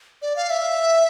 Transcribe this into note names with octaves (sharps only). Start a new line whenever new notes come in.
D5
F5
E5